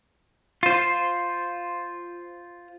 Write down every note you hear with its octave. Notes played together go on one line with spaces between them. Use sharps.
F4 C5